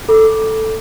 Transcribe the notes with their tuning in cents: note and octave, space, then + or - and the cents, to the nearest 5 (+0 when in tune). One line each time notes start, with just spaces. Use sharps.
A4 +0 B5 -40 D6 +0